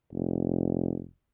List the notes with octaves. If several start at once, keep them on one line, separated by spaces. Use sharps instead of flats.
F1